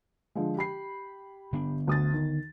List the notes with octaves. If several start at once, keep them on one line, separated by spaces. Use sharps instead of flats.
D3 F3 G#3
G4 B5 C7
D3 B3 D4
D2 D#6 A6
D#3